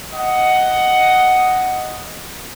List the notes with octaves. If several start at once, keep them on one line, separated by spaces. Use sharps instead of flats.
D#5 F#5